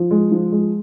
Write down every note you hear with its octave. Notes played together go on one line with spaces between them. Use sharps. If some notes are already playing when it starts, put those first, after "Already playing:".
Already playing: F3
G#3
F3
G#3